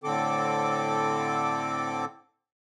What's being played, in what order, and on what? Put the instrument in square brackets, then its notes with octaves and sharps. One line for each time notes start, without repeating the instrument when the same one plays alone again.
[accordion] A2 D3 C4 A4 D6